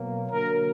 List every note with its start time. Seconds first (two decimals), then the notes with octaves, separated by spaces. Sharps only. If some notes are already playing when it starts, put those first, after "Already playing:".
Already playing: B2 F#3 A#3
0.30 D3 F#3 A#3 A#4